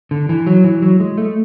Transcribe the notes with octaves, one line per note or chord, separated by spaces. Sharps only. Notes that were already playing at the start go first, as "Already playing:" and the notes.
D3
E3
F#3
E3
F#3
G#3
A3